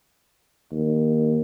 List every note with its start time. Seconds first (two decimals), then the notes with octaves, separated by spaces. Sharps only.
0.72 D#2